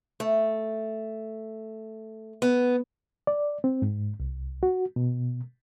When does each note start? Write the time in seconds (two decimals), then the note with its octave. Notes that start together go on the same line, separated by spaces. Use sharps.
0.20 A3
2.42 B3
3.27 D5
3.64 C4
3.82 G#2
4.20 C2
4.63 F#4
4.96 B2